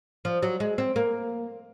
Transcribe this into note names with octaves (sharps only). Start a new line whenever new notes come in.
F3
F#3
G#3
C4
A#3